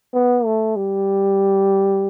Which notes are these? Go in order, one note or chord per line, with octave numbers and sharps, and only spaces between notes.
B3
A3
G3